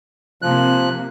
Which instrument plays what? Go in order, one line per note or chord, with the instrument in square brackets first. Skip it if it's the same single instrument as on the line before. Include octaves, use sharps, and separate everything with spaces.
[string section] C3 A#3 [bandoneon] F3 F#6